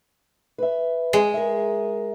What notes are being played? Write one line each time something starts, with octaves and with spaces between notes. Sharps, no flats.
B4 E5
G#3
A#4 E5